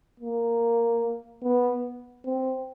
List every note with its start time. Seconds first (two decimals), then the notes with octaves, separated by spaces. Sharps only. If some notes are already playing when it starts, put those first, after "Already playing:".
0.20 A#3
1.43 B3
2.25 C4